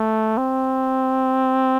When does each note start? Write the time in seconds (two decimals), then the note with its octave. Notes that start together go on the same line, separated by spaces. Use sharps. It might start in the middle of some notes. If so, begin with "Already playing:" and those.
Already playing: A3
0.38 C4